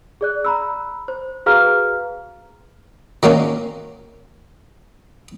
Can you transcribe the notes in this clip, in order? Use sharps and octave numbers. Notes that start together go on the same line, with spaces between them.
G#4 D5 F#6
A#5 B5 E6
C5
F#4 G#4 B4 F5 A#5 F6
D#3 F#3 A#3 C#4